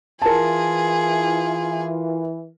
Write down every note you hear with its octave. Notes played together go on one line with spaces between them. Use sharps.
E3 F4 G#4 A#4 A5